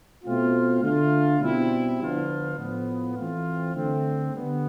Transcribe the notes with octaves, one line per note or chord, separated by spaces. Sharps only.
B2 A3 C4 F4
D3 A3 D4 F4
B2 G3 C4 E4
D3 F3 B3 D4 F4
A2 F3 B3
E3 A3 C4 F4
D3 A3 C4
D3 G3 B3